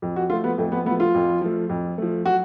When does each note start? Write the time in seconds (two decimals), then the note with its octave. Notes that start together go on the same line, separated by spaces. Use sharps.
0.02 F2
0.16 F#4
0.30 F3 A3 F4
0.44 B3
0.58 F2 A3
0.72 B3
0.85 A3 B3
0.91 F3
1.00 F4
1.14 F2
1.41 F3 A3
1.69 F2
1.98 F3 A3
2.26 F#3 F#4